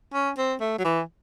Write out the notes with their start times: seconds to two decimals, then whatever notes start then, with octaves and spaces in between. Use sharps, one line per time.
0.14 C#4
0.38 C4
0.60 A3
0.78 F#3
0.85 E3